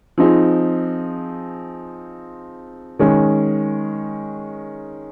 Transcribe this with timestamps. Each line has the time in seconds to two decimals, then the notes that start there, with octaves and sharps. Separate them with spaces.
0.18 F3 C4 D#4 G#4
2.99 D#3 G#3 C#4